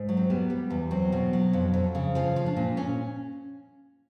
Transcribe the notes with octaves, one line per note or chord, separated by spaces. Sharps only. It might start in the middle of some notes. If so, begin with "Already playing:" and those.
Already playing: G#2
F#3
C4
G3 B3
G3
E2
F#3 C4
B2
F#3
F2
F2
C#3
F3 C#4
F3
D4
A#2
C#4